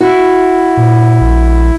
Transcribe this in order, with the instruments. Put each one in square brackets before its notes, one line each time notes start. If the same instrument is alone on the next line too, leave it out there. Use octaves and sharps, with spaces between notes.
[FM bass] E4 [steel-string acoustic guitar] F#4
[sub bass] A#2
A#1